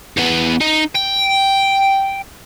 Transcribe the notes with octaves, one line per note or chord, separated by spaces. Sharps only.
E2 B3
D#4
G5